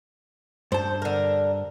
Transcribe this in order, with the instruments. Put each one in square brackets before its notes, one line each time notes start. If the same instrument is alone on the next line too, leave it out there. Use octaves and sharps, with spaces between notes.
[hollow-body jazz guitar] G2 A5 [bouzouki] C5
[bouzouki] D3 A#4